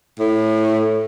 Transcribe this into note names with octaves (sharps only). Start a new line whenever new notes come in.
A2